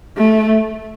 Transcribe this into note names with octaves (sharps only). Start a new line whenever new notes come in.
A3